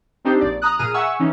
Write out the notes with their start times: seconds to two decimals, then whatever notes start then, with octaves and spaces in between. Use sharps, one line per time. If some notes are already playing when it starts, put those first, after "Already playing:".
0.25 C4 D4 D#4 G4 C5
0.41 A#1 D5
0.62 A#5 D#6 F#6
0.79 A#2 G#4 A#5 F6 D#7
0.94 E5 F#5 G#5 C#6 E6
1.19 E3 C#4 D#4